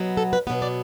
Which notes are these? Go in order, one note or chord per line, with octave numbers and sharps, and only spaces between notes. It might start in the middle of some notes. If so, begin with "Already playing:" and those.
Already playing: B2 F#3 B3
A4
B4
B2 F#3 B3 B4
D5